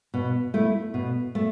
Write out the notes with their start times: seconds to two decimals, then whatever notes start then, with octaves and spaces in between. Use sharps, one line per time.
0.14 B2
0.54 A3 E4
0.94 B2
1.35 A3